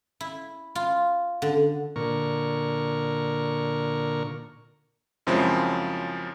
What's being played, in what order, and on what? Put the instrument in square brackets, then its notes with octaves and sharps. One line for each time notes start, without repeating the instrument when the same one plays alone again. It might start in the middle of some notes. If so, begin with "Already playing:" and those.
[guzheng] E4
F4
D3
[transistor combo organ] A#2 D3 A#4 C#6
[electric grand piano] F#2 C#3 F3 G#3 C4 E4